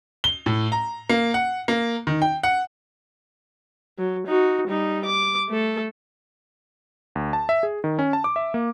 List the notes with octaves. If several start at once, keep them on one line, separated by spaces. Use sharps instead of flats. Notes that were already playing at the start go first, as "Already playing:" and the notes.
G7
A2
A#5
A#3
F#5
A#3
D#3
G5
F#5
F#3
D#4 F#4
G3 D#4
D6
A3 A4
D2
A5
E5
G#4
D#3
C#4
A5
D6
E5
A#3